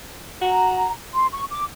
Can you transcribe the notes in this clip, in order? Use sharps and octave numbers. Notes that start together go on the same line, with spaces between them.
F#4 A#5
C6
C#6
D6